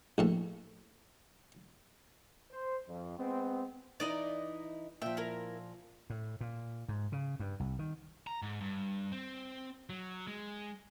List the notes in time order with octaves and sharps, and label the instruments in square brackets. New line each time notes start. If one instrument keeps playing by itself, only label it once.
[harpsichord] A#1 A2 A5
[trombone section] C5
F2
G#3 B3 C4
[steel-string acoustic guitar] E3 D#4 E4 [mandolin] D5 D#5 A#5
[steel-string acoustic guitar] A#2 F3 [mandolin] E5 G5
[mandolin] E4 A#4
[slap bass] A2
A#2
G#2
C#3
G2
C2
D#3
[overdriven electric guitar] A#5
G#2
G2
C4
F#3
G#3